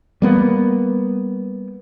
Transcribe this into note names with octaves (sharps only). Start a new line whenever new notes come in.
G3 A#3 B3